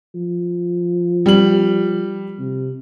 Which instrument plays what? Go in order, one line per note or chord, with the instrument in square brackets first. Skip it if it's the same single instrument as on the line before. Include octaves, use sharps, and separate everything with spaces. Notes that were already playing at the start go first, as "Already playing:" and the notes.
[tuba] F3
[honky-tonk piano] G3 F#7
[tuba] C3